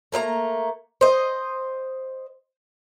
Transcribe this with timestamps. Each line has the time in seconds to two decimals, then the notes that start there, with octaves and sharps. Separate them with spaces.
0.12 A3 A#3 E5 A#5
1.01 C5 D#5